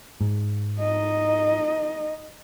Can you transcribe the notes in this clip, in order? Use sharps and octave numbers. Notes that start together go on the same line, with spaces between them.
G#2
D#4 D#5